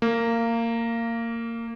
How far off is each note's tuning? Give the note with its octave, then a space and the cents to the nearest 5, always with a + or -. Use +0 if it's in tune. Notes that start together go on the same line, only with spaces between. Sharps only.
A#3 -20